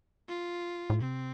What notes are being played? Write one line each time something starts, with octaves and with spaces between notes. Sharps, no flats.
F4
A2
C3 C4